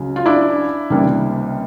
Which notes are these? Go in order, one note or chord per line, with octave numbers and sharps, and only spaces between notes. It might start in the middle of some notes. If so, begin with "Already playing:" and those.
Already playing: C#2 C#3 F#3
F4
D4 E4
C#2 C3 D#3 G3 A#3